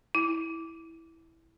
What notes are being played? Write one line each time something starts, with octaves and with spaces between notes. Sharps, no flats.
E4